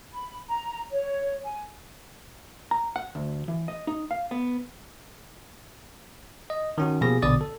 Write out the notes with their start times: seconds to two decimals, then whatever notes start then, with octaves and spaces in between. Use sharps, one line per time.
0.13 B5
0.49 A#5
0.91 C#5
1.44 G#5
2.71 A#5
2.96 F#5
3.15 D2
3.48 E3
3.68 D#5
3.87 D#4
4.11 F5
4.31 B3
6.50 D#5
6.78 D#3 C#4 F#4
7.01 B2 F3 A#3 G4 G#4 A#6
7.22 A#1 B2 D3 D5 D#6 A6
7.41 A4